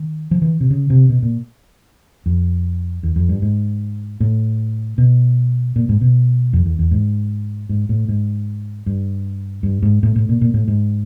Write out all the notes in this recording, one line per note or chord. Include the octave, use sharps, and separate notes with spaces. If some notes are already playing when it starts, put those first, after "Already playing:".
Already playing: D#3
F3
E3
C3
C#3
C3
B2
A#2
F2
E2
F2
G2
G#2
A2
B2
A#2
G#2
B2
F2
E2
E2
G#2
G#2
A2
G#2
G2
G2
G#2
A2
A2
A#2
A#2
A2
G#2